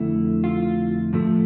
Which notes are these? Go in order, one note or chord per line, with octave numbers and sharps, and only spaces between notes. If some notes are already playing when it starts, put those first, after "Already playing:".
Already playing: F2 D3 A3 E4
F4
A2 F3 A3